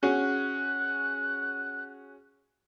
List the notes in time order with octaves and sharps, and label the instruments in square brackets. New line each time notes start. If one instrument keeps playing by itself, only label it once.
[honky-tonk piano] C#4 F#4 G#4 [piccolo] F#6